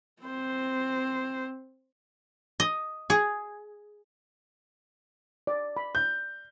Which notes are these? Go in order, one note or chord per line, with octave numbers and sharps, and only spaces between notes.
C4 C5
D#5
G#4
D5
B5
G6